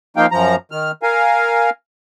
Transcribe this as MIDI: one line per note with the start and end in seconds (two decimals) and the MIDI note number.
0.17 0.26 53
0.17 0.26 58
0.17 0.26 63
0.17 0.26 77
0.17 0.26 79
0.31 0.56 42
0.31 0.56 53
0.31 0.56 82
0.71 0.91 51
0.71 0.91 89
1.03 1.70 70
1.03 1.70 77
1.03 1.70 80